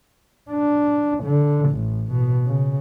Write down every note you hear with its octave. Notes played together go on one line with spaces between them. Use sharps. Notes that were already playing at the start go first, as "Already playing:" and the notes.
D4
D3
A1
B2
C#3